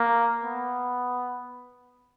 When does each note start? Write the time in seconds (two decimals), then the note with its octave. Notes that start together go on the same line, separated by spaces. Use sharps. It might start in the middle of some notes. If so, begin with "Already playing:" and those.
Already playing: A#3
0.43 B3